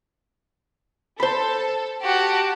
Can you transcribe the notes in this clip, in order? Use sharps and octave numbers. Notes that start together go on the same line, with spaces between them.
A4 C5 B5
F#4 G4 A5